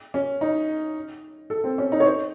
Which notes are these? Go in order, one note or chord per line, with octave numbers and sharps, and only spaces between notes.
C#4
D#4
A4
C4
C#4
D#4
C#5
C5